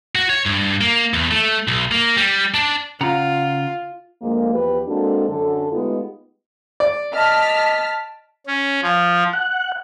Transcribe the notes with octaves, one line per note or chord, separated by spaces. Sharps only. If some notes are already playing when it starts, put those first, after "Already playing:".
F#4
C#5
G2
A#3
E2
A3
B1
A#3
G3
D4
C#3 F4 F#5 A#5
D2 F3 G#3 A#3
E2 F3 G4 B4
G#3 A#3 C4 D4 F#4 A4
F#2 D3 A4
G#3 A3 B3 D#4 F4 G4
D5
D#5 A5 F6 B6
C#4
F3
F#5